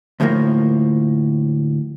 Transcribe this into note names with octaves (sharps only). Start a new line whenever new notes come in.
D2 A2 F3 G3 A#3